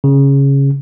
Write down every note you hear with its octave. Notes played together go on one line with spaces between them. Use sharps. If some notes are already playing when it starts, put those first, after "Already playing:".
C#3